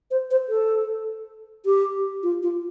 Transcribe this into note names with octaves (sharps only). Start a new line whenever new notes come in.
C5
C5
A4
G4
F4
F4